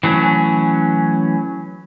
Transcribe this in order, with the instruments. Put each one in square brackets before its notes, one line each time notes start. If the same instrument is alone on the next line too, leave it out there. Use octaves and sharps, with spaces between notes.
[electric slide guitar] E3 F#3 A3 C#4